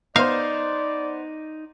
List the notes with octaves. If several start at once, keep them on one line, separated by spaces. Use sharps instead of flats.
B3 D#4 C5 D5 F5